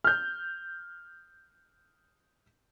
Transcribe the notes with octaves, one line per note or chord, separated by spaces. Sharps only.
F6 G6